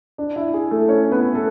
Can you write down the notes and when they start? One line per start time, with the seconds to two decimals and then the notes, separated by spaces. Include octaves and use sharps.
0.18 D4 D5
0.36 E4 E5
0.54 G#4
0.70 A3 A4
0.88 C#4 C#5
1.12 B3 B4
1.35 A3 A4